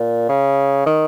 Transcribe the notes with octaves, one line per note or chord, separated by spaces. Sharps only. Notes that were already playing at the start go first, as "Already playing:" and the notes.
Already playing: A#2
C#3
D#3